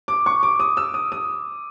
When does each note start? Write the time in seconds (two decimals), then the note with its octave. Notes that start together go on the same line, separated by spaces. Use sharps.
0.08 D6
0.26 C#6
0.43 D6
0.60 D#6
0.77 E6
0.94 D#6
1.12 D#6